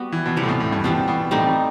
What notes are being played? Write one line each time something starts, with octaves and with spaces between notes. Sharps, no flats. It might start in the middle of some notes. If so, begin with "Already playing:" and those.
Already playing: G3 B3 F#4
E3
B2
C3 E3 G3 C4
A2
B2
A2
G2
B2 E3 G3 C4
B2
A2 G3 C4 D#4